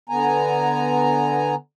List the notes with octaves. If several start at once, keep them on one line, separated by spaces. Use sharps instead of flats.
D3 B3 G#5 A#5